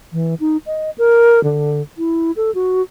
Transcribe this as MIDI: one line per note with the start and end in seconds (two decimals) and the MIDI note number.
0.13 0.35 52
0.40 0.57 63
0.66 0.90 75
0.98 1.42 70
1.44 1.81 50
1.98 2.31 64
2.36 2.53 69
2.55 2.82 66